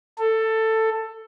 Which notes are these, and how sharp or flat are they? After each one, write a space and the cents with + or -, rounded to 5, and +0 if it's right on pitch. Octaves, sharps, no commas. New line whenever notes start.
A4 +15